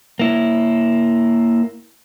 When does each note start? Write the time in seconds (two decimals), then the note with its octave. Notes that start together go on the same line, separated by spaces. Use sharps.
0.19 A#3 E4